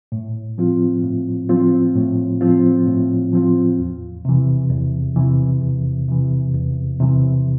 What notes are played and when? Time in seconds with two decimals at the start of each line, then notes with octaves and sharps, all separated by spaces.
0.12 A2
0.58 F3 C4 F4
1.03 A2
1.49 F3 C4 F4
1.95 A2
2.41 F3 C4 F4
2.87 A2
3.33 F3 C4 F4
3.79 E2
4.25 C3 E3
4.70 E2
5.16 C3 E3
5.62 E2
6.08 C3 E3
6.54 E2
7.00 C3 E3